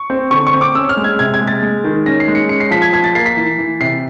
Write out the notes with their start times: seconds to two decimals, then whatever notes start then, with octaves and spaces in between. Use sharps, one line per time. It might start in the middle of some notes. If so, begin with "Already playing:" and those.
Already playing: C#6
0.10 C4
0.31 D3 C#6
0.47 C#6
0.54 C4
0.61 D6
0.75 C#4 E6
0.89 F6
0.97 G#3
1.04 G#6
1.19 C3 G#6
1.34 G#6
1.41 G#3
1.47 A6
1.62 G#3
1.84 D#3
2.06 C#4 A#6
2.20 C7
2.28 G#3
2.35 C#7
2.49 C#4 C#7
2.60 C7
2.71 F3 B6
2.82 G#6
2.93 F3 G#6
3.04 A6
3.15 A#3 C7
3.26 B6
3.37 E3
3.58 E3
3.81 C3 C7